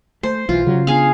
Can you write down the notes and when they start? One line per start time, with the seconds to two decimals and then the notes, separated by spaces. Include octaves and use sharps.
0.23 A3 C5
0.49 B1 E3 F4
0.67 C#3 F#3
0.87 B3 D4 G#4 F5